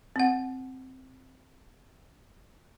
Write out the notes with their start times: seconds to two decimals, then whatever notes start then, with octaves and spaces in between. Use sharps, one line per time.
0.16 C4 F#5